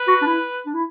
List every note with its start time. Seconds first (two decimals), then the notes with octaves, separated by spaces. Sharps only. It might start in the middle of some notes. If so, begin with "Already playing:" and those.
Already playing: B4
0.08 F#4
0.22 D4
0.26 E4
0.66 D4
0.74 E4